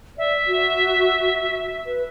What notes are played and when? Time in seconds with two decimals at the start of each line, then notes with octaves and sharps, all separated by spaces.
0.18 D5 E5
0.47 F#4
1.86 B4